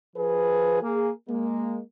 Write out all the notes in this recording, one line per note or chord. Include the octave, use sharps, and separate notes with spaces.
F3 G#4 B4
A#3 G#4
G#3 A#3